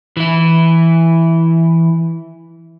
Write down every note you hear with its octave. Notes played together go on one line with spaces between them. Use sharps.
E3 E4